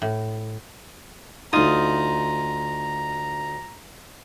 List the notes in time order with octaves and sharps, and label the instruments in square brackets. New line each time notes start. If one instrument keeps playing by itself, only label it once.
[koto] A2
[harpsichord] D2 D#6 [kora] D#4 F4 [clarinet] A#5